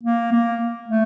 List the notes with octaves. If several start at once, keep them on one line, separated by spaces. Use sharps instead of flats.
A#3
A#3
A3